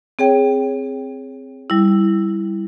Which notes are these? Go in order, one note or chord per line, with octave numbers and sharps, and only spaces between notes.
C4 G#4 C#5 G5
G3 E4